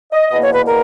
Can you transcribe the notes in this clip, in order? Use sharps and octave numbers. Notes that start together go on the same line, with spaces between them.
D#5
E2 B2 A#3 D#5
C#5
B4
A#4